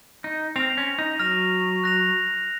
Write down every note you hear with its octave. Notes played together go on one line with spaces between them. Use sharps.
D#4
C4 F6 A#6 F7
C#4
D#4
F#3 F6 A#6 F7
F#6 A#6 F7